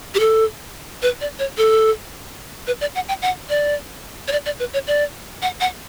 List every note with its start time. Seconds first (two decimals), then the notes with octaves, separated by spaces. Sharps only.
0.15 G4
0.20 A4
1.02 B4
1.21 D5
1.39 C#5
1.57 A4
2.67 B4
2.81 D5
2.95 F#5
3.08 G5
3.22 F#5
3.50 D5
4.28 C#5
4.32 D5
4.46 D5
4.59 B4
4.73 C#5
4.87 D5
5.42 F#5
5.61 F#5